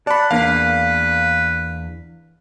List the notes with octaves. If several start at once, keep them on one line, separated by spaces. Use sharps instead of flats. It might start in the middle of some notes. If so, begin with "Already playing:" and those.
D5 F#5 A5 B5
E2 A#3 D4 B4 F5